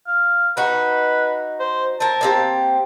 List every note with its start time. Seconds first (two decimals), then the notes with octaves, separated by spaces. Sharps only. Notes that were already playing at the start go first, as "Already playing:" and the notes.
0.07 F5
0.57 D#4 F#4 B4
1.60 C5
2.00 C4 A#4 A5
2.21 A#3 C4 G4